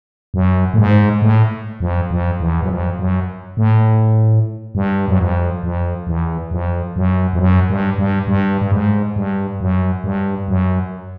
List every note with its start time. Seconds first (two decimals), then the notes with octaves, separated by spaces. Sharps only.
0.34 F#2
0.74 A2
0.78 G#2
1.22 A2
1.80 F2
2.10 F2
2.40 E2
2.63 F#2
2.69 F2
2.99 F#2
3.57 A2
4.75 G2
5.08 F#2
5.19 F2
5.63 F2
6.07 E2
6.51 F2
6.96 F#2
7.33 F2
7.39 F#2
7.70 G2
7.98 G2
8.28 G2
8.62 G2
8.72 G#2
9.16 G2
9.61 F#2
10.04 G2
10.48 F#2